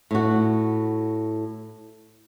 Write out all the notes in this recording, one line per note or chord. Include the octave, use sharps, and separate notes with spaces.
A2 F#4